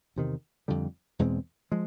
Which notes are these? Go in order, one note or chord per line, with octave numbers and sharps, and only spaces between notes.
E2 C3 D#3
F2 D3 G3
E2 B2 G#3 C4
F3 G#3